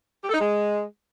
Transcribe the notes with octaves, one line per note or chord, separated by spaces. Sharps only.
G4
A4
D#4
G#3